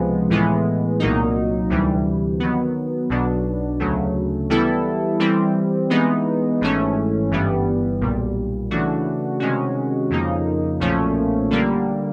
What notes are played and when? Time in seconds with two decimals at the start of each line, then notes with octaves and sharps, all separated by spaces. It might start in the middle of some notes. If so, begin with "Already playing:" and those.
Already playing: C#2 C3 F3 G#3 B3
0.30 A2 E3 G#3 B3
1.00 C2 A#2 F#3 A#3 D#4
1.70 D2 C3 E3 G3
2.40 D#3 F#3 B3
3.09 B1 B2 F#3 B3 D4
3.80 D2 C#3 F#3 A3
4.50 E3 G3 B3 E4 A4
5.20 E3 G3 C4
5.90 E3 G#3 B3 D#4
6.61 G#1 G#2 E3 A3 C#4
7.31 G1 G2 E3 G3 B3
8.01 B1 A#2 G3
8.71 C#3 E3 A3 D4 F#4
9.40 C3 D#3 G#3 C#4 F#4
10.10 F2 C#3 F3 A#3 D#4
10.80 B1 A#2 F3 A3 C#4
11.50 D3 G3 A#3